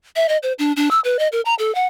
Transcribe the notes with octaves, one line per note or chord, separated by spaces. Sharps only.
E5
D#5
C5
D4
D4
E6
B4
D#5
A#4
A#5
A4
F#5